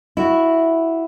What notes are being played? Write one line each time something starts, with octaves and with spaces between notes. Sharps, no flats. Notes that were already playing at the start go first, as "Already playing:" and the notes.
E4 F#4